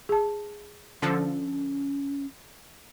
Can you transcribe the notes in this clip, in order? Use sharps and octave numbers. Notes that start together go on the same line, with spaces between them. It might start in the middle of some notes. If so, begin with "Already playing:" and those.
G#4 A5
D3 F3 C#4 A4